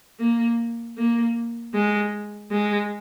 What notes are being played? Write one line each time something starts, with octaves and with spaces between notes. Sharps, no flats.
A#3
A#3
G#3
G#3